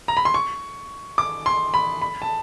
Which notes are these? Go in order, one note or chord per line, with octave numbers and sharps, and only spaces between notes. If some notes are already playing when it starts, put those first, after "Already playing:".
A#5
B5
C6
C#6
D6
C6
B5
B5
A5